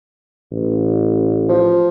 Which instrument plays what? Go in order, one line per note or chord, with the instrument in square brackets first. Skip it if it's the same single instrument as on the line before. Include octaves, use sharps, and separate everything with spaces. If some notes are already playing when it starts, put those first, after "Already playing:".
[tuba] A1
[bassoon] F3